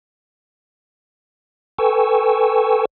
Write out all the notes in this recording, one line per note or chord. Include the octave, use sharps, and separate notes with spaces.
A4 B4 G5 G#5 C#6 E6